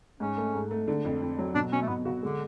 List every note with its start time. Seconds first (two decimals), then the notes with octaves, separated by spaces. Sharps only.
0.20 G#2 C#4
0.37 A3
0.54 G#2
0.71 A3
0.88 D3
1.05 F2
1.22 F2
1.38 F#3
1.55 B2 D4
1.72 B2 C#4
1.82 A3
1.88 B2 B3
2.05 C#3 F#4
2.22 D3 G#3